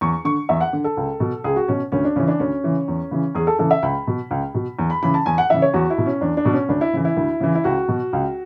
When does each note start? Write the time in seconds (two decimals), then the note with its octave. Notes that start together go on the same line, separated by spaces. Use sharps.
0.01 E2 C#6
0.25 D3 C#6
0.49 E2 E5
0.61 F#5
0.73 D3
0.84 A4
0.97 C#2
1.20 B2
1.44 C#2 G#4
1.56 F#4
1.68 B2 C#4
1.92 D2 C#4
2.05 D4
2.16 C#3 E3 C#4
2.28 D4
2.39 D2 C#4
2.64 C#3 E3
2.88 E2
3.11 C#3 E3
3.35 E2 G#4
3.47 A4
3.59 C#3 E3 A4
3.71 E5
3.82 C#2 B5
4.07 B2
4.31 C#2
4.54 B2
4.79 E2
4.90 B5
5.02 C#3 E3 B5
5.14 A5
5.26 E2 G#5
5.38 F#5
5.50 C#3 E3 E5
5.62 C#5
5.74 E2 F#4
5.90 E4
5.98 B2
6.06 C#4
6.21 E2 D4
6.37 D4
6.45 B2
6.53 C#4
6.69 D2 D4
6.81 E4
6.93 C#3 E3
7.05 E4
7.17 D2
7.40 C#3 E3
7.55 E4
7.64 C#2 F#4
7.88 B2
8.13 C#2